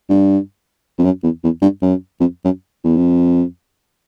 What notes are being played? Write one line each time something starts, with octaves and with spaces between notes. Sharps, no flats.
G2
F2
F#2
E2
E2
G2
F#2
F2
F#2
E2
F2